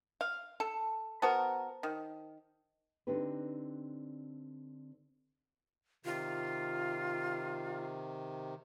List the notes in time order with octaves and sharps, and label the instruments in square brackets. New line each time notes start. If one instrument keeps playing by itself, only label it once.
[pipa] F5
A4
[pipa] B3 F#4 A#4 [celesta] C5 A5
[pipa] D#3
[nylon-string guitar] D3 C4 D4 D#4 G4 B4
[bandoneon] C3 D#3 [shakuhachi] F4